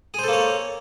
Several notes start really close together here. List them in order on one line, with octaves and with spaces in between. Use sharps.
G#4 C5 A4 A#3 C#5